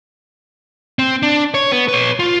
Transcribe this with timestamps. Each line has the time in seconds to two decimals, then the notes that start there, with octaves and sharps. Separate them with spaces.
0.99 C4
1.23 D4
1.54 C#5
1.72 B3
1.89 B4 C#5
2.19 F4